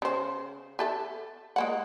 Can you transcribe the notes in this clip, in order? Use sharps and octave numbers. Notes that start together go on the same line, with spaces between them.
C#3 C5
G4 A4 E5
G#3 A#3 F#5